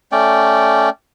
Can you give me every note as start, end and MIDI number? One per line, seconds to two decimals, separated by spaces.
0.12 0.89 57
0.12 0.89 61
0.12 0.89 74
0.12 0.89 79